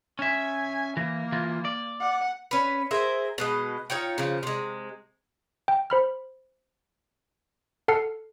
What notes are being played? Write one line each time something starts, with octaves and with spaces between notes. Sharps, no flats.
C#4 E5 G#5
E3 A#3
E3 F4
D5
F#5
C#4 B4
G#4 A#4 C5 E5
B2 G#3 D#5
D#4 F4 C#5 G5
C#3 F3
C3 G#3
G5
C5 B5 F6
A4 F#5 A5 F6 C7 C#7